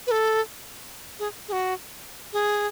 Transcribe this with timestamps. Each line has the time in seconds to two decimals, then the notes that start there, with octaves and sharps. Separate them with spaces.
0.07 B4
0.11 A4
1.19 G#4
1.48 G#4
1.52 F#4
2.33 G#4